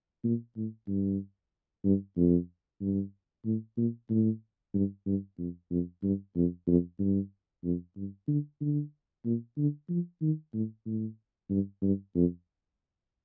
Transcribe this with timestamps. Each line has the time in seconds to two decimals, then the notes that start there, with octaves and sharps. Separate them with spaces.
0.24 A#2
0.56 A2
0.88 G2
1.84 G2
2.17 F2
2.81 G2
3.45 A2
3.77 A#2
4.10 A2
4.74 G2
5.06 G2
5.39 F2
5.71 F2
6.03 G2
6.36 F2
6.67 F2
6.99 G2
7.64 F2
7.97 G2
8.28 D3
8.61 D3
9.25 A#2
9.57 D3
9.89 F3
10.22 D#3
10.54 A2
10.86 A2
11.50 G2
11.82 G2
12.15 F2